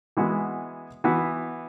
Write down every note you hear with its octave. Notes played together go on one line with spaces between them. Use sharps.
E3 G#3 B3 F#4
E3 B3 F#4